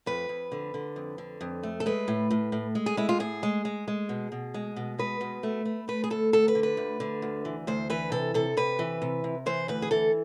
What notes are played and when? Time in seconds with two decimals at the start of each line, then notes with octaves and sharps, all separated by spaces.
0.06 F2 B4
0.29 F2
0.52 D3
0.74 D3
0.96 F2
1.18 D3
1.41 F2
1.63 A3
1.80 A4
1.86 G#3 B4
2.08 A2
2.31 A2
2.52 A2
2.75 G#3
2.86 G#4
2.97 G#3 E4
3.09 F4
3.20 A2 G#4
3.43 G#3
3.65 G#3
3.88 G#3
4.09 B2
4.32 B2
4.54 G#3
4.76 B2
4.99 G#3 B4
5.21 B2
5.43 A3
5.65 A3
5.88 A3 B4
6.04 G#4
6.10 D2 A4
6.33 D2 A4
6.48 B4
6.55 D3
6.63 B4
6.77 D2
7.00 D3
7.22 D2
7.45 E3
7.67 D2 C5
7.90 E3 B4
8.12 C3 A4
8.34 C3 A4
8.57 C3 B4
8.79 E3
9.02 C3
9.24 C3
9.46 E3 C5
9.68 D2 B4
9.82 G#4
9.91 E3 A4